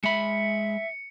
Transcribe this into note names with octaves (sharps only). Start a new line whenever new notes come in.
G#3 E5 B5 C#7